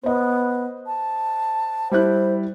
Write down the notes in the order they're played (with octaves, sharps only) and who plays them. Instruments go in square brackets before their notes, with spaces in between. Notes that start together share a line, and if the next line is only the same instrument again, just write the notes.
[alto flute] B3 [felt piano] C5 D#5
[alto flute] A5
[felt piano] G3 E4 F#6 [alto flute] C5